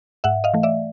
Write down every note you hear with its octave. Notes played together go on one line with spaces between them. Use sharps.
G#2 E5 F#5
D#5 F5
E3 A3
D5 E5